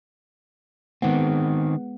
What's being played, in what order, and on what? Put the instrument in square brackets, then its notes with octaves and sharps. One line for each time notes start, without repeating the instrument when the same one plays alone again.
[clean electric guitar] D#3 C4 [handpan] G#3 B3 F#5